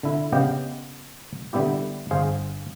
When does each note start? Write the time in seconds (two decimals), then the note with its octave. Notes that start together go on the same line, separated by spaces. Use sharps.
0.03 D3 E4
0.32 C#3 B3 G4 D#5 F5 G5
1.53 D3 G3 B3 E4 G4
2.11 G1 G#4 C5 F5